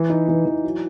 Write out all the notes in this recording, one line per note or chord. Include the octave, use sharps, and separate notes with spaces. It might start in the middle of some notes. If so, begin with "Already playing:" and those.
Already playing: E3
D#4
E3
E3
F#3